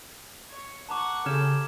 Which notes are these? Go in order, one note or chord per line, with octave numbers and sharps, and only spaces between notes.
C#5
F#5 A5 A#5 C#6 D6
C#3 G4 A4 F6 G#6 E7